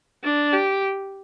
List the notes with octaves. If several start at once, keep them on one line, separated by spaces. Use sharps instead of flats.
D4
G4